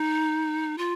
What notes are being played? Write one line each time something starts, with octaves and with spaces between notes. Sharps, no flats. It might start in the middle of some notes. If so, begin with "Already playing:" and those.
Already playing: D#4
F4